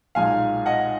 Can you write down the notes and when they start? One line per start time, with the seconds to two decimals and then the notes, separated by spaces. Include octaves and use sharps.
0.15 B1 A#2 G#3 D#4 F5 G#5
0.66 D#5 F#5